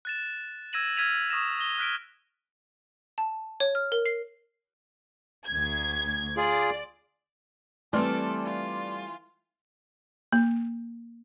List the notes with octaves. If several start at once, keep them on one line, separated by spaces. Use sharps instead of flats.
F#6 A6 E7
E6 G#6 A#6 D#7 E7 F#7
E6 F6 G#6 B6 D#7 F7
C#6 D#6 A#6 E7
D#6 A#6 G7
F6 F#6 B6 D7
A5
C#5
F6
A#4
C7
D2 G#6
F4 G#4 D5
E3 G3 A3 C4 A4 D5 C6 F6
F4
A#3